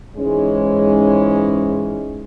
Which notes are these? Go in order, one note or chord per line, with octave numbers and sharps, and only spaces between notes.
G#2 E3 G#3 C#4